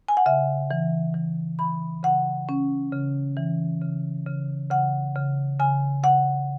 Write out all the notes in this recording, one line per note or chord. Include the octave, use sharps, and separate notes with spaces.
G#5
F#5
C#3 E5
E3
E3
E3 B5
C#3 F#5
C#4
C#3
E3
C#3
C#3
C#3 F#5
C#3
C#3 G#5
C#3 F#5